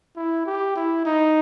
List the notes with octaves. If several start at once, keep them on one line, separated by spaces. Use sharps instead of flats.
E4
G4
E4
D#4